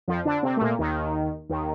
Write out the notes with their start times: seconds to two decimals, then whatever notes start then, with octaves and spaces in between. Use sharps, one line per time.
0.08 F2 F3
0.25 D3 D4
0.43 C3 C4
0.57 A3
0.61 A#2 A#3
0.79 D#2 D#3
1.49 D#2 D#3